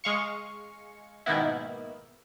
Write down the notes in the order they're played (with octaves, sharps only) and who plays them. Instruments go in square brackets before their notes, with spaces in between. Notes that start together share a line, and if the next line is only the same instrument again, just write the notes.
[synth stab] G#3 F5 C#6
G#2 B2 D#3 A#3 B3 E4